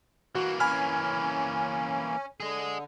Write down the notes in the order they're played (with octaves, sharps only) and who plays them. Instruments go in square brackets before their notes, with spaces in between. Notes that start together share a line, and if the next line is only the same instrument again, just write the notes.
[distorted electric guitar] E3 A#3 [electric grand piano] F#4 [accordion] F#6
[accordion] C#4 [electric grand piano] G#5 B5 F6
[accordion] D3 [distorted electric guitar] G#4 D#5